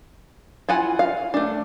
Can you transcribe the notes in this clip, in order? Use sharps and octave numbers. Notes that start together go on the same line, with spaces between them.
E4 F4 F#5 G#5
F5
A3 D4